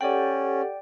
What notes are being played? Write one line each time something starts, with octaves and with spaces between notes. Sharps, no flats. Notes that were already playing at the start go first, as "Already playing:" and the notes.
C#4 G4 A4 D5 F#5 G5